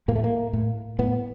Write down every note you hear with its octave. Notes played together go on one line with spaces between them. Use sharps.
A2 A#3
A3
A#3
A2
A2 B3